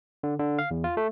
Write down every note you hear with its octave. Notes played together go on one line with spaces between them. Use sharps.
D3
D3
F5
E2
F4
A3